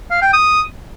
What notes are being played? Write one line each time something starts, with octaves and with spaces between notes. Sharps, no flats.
F5
G5
D#6